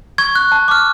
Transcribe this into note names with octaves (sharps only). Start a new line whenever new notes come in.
C#6 G#6
F#6
A5
D6 F6